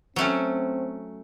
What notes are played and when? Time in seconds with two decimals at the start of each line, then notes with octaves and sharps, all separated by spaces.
0.16 F#3 A3 C4 C#4